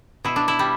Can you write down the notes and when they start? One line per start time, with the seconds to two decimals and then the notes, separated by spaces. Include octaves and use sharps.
0.25 B2 E4
0.36 D4
0.48 E4
0.59 G3